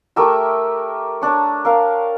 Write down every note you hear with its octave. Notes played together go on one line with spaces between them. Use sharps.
A3 G4 A#4 E5
D4 C#5
A#4 F5